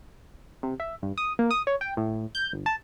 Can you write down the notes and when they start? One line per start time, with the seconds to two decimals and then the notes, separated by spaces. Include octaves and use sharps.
0.63 C3
0.80 E5
1.02 G2
1.18 D#6
1.39 A#3
1.51 D#6
1.67 C#5
1.81 G5
1.97 A2
2.35 G6
2.53 G1
2.66 A5